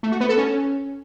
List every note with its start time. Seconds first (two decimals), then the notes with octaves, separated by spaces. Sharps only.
0.03 A3
0.12 F#4
0.20 B3
0.29 A4
0.38 C#4